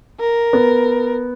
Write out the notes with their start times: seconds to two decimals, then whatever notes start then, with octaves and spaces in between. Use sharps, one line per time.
0.20 A#4
0.53 B3